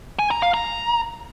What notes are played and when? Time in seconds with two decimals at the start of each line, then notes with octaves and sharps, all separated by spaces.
0.19 G#5
0.31 A#5
0.42 F5
0.54 A#5